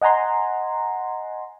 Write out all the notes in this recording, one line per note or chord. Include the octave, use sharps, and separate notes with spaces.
D#5 F#5 G#5 A#5 C6